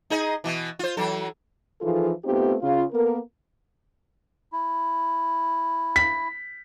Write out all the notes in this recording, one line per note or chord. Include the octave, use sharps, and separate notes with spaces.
D#4 G#4 D#5
B2 E3
F4 C5
E3 F#3 A4
E3 F3 D#4 F4 G#4 A4
A3 B3 C4 D#4 F4 G4
C#3 F4
A#3 B3 A4 A#4
E4
B6